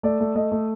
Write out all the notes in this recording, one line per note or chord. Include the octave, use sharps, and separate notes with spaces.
A3 D5
A3
A3 D#5
A3